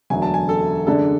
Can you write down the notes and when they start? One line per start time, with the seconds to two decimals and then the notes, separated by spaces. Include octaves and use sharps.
0.10 E1 D2 D3 F#3 G#5
0.22 A5
0.34 G#5
0.49 A4
0.86 F#2 D3 G#3 D4 A4